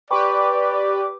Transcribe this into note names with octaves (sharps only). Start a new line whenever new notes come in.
G4 B4 D5 G5 B5 C#6 D6